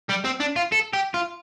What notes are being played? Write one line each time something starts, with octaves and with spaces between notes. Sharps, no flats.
G3
C4
D4
F4
A4
G4
F4